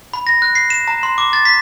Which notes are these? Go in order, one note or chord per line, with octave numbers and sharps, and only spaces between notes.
B5
A#6
F#6
C7
E7
A#5
C6
D6
A6
B6